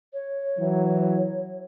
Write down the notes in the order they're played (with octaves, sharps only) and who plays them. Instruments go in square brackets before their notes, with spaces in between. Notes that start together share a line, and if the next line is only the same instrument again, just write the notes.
[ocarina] C#5
[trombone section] E3 F#3